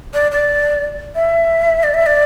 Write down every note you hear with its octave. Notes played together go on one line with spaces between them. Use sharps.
D5
D5
E5
D5
E5
D5